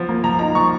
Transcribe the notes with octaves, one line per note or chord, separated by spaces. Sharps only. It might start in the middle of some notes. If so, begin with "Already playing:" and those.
Already playing: F3 B3
A#3
F3 A#5
D#4 A#5
F3 C#6